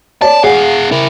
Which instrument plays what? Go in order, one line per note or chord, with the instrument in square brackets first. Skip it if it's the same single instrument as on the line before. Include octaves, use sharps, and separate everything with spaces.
[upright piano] C#5 D5 [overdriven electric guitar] A5
[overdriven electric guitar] B3 F5 [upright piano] G#4 F#5 G#5
[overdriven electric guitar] E4 A#4